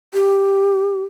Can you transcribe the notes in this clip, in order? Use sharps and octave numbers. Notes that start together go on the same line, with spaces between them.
G4